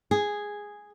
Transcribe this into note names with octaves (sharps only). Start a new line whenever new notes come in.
G#4